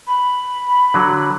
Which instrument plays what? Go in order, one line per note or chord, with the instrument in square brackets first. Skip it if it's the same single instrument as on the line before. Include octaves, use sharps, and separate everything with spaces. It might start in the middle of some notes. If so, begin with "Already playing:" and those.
[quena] B5
[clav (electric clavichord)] D3 F#3